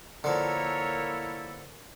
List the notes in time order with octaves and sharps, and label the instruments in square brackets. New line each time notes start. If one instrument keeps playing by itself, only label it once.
[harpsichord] D3 F3 [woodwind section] A#3 E4 A4 [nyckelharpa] A#4 C#5